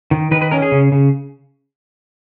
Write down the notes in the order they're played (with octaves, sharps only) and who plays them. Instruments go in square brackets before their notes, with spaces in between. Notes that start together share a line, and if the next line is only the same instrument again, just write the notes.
[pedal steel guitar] D#3
D#3 B4
B4
C#4 A#4
G#4
C#3
C#3